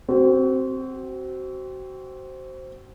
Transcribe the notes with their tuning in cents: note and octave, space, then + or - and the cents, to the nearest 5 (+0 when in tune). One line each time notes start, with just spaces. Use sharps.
C4 +0 F#4 +30